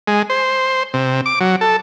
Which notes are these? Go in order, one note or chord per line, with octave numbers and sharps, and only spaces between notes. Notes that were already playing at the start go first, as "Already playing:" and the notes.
G#3
C5
C3
D6
F#3
A4